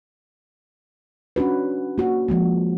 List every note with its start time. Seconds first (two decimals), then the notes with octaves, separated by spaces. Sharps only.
1.36 C#4 D4 F#4 B4
1.98 A#3 F#4
2.28 F3 G#3 A#3